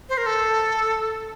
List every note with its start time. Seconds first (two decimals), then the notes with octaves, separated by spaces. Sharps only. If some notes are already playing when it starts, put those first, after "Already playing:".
0.09 C5
0.17 A#4
0.26 A4